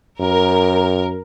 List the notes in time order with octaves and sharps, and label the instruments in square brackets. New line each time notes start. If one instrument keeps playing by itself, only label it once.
[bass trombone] F#2 [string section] A#4